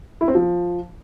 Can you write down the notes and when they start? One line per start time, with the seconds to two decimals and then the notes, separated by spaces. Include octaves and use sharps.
0.21 E4
0.28 C4
0.35 F3